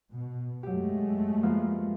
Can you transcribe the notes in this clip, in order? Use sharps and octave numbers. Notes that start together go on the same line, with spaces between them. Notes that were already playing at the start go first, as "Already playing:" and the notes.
B2
F#2 F#3 G#3 A3 G4
F3 A#3 B3